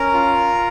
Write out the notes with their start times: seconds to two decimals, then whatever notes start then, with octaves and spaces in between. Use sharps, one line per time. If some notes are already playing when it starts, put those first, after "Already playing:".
Already playing: C#4 A#4 A#5
0.13 F4